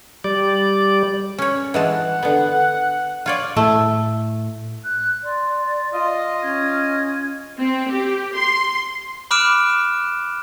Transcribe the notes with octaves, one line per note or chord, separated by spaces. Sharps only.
G3 D5
C#4 C#5
E3 G#3 F#5 A5
D3 B3
F4 C#5 D5
A2 A3
F#6
D5 C6
F4 D#5
C#4 G#6
C4
G4
C6
B5 D6 F6 F#6 D7 E7